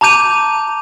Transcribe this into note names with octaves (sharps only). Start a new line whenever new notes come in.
A5 A#5 D6 G6 D#7 F7